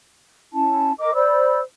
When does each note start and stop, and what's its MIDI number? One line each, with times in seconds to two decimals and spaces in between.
0.52 0.92 61
0.52 0.92 64
0.52 0.92 81
0.98 1.14 70
0.98 1.14 75
0.98 1.14 86
1.14 1.59 72
1.14 1.59 74
1.14 1.59 83
1.14 1.59 88